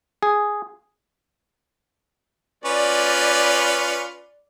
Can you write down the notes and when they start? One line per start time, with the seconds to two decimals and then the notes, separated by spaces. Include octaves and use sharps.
0.23 G#4
2.65 C#4 F4 B4 D5